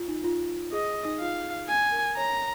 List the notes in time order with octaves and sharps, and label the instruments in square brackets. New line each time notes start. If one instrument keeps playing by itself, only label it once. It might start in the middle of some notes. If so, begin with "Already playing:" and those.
Already playing: [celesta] F4
D#4
F4
[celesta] G#4 [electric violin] D#5
[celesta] D#4
[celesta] F4 [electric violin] F5
[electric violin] G#5
[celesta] A#4
[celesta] C#5 [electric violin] A#5